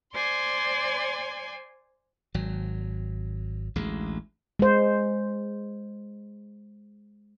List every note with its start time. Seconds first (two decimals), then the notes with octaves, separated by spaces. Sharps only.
0.13 C5 D5 G#5 C6 G#6
2.34 G#1 F#3
3.76 A1 D2 G#3
4.59 G#3 C5